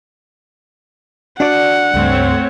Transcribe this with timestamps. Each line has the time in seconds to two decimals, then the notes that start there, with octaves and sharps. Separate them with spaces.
1.40 D4 F#4 D5 F#5
1.94 C#2 G2 A3 C4 C#5